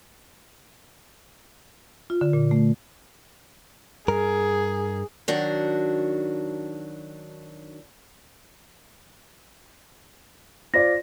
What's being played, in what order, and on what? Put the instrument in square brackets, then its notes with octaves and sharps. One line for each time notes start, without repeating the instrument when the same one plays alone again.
[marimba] F4
D3
A#2
A3
[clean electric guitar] G2 A#4 [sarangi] G#4
[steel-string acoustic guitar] D#3 F#3 D4 F#4
[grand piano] F4 C5 D5 [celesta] A#6